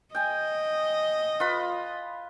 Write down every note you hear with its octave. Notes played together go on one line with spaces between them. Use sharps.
D#5 G5 G#5
F4 B4 B5